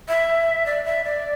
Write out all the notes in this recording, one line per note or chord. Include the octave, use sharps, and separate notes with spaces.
E5
D5
E5
D5